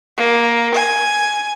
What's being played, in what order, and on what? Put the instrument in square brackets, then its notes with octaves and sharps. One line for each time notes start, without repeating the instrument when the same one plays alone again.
[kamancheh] A#3
G#5